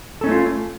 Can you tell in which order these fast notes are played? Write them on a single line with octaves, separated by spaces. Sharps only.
A4 C#4 D#4 A3 F4